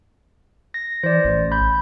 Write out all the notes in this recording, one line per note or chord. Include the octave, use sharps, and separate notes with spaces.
A#6
E3 C5 D5
A1
B5 G6